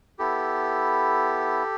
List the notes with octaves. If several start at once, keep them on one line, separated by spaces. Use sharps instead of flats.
B3 E4 G4 A4